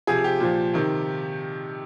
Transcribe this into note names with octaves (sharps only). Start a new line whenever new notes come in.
C3 F3 G#4
G4
A#2 F3
C3 D#3